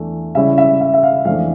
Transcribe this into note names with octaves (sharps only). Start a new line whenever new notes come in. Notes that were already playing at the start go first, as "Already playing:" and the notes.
Already playing: E2 E3 A3 D4
C#3 G3 C#4 E4 E5
E5
E5
E5
F5
F2 E3 A3 D4 F5